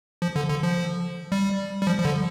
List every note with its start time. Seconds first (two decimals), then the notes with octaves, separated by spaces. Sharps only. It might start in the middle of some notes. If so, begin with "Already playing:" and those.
0.22 F3
0.36 D3
0.50 D3
0.63 F3
1.32 G3
1.82 G3
1.87 F3
2.00 F3
2.05 D3